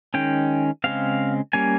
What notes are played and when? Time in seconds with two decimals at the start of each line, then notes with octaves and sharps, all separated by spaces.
0.14 D#3 G#3 C#4 G5
0.84 C#3 G#3 C4 F5
1.53 G3 A#3 C#4 G#5